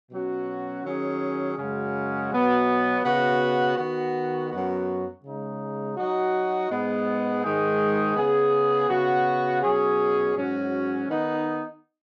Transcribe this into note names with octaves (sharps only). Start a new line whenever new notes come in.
B2 F#3 C#4 F#4
D#3 F#3 C#4 G#4
F#2 C#3 G#3 C#4 F#4
B2 F#3 B3
C#3 B3 F#4
D#3 B3 F#4
F#2 F#3 B3 F#4
C#3 G#3 D#4
F#3 D#4 F#4
G#2 G#3 B3
G#2 D#3 G#3 D#4 G#4
C#3 B3 G#4
C#3 B3 F#4
B2 F#3 C#4 G#4
G#2 F#3 C#4 F#4
D#3 B3 D#4